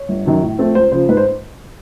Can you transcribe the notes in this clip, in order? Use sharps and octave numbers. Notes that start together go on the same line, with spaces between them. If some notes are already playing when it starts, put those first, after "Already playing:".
Already playing: C#5
G1
F#2 D#3 F#3
A2
F3 A3 C4
C#2 C5
C#3 F3 C5
G#2 B4
C5